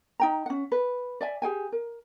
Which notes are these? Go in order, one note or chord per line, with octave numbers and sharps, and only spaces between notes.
D#4 G5 A#5
C#4 F#5
B4
D5 E5 G#5
G4 G#4 G5 G#5
A#4